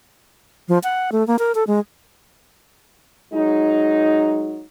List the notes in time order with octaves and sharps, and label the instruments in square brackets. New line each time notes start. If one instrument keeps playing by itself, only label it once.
[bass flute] F3
F#5
A3
A#3
A#4
A4
G#3
[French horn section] F#3 G#3 D#4